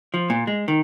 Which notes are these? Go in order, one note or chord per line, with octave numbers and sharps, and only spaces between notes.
F3
A#2
G#3
D#3